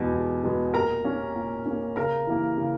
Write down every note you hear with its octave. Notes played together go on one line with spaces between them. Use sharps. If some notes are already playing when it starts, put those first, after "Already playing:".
Already playing: E2 B2 G#3 B3
E2
B2 G#3 B3
A#2 A#4 A#5
A#3 C#4
A#2
C#4
A#3
C#3 A#4 A#5
E3 A#3
C#3